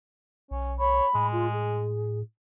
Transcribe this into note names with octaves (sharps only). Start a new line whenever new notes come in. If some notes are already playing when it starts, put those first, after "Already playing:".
B1 C#4
C#5 B5
A2 G#3
F4
G#4